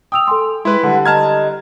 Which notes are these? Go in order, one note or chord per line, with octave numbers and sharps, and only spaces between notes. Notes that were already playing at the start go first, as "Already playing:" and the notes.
G5 D#6 E6 F7
A4 G#5 C6
G#3 E4 B4 C6
D3 G3 F#5
D#5 A5 A#5 F6 G#6